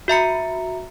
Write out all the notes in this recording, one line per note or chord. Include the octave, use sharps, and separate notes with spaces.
F#4 E5 A#5 C#7